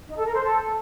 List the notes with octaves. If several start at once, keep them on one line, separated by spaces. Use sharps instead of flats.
D#4
A4
A#4
C5
A4